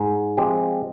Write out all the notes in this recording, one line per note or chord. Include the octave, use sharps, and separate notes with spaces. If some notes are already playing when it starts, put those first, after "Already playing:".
Already playing: G#2
F3 G#3 C4 G4